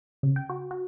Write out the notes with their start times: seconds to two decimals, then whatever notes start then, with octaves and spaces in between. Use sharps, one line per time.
0.23 C#3
0.36 G5
0.50 F#4
0.71 F#4